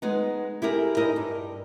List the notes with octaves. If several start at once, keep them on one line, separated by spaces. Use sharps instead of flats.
G#3 B3 D#4
E4 G4 G#4 A#4
D#4 E4 A#4 D#5
G2